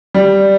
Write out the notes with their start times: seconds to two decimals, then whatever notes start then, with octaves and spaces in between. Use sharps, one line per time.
0.14 G3